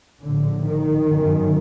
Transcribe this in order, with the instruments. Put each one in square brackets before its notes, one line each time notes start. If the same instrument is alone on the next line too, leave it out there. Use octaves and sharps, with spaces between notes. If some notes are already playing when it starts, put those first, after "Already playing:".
[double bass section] A#1 A2 D3
D#3
G1 F#2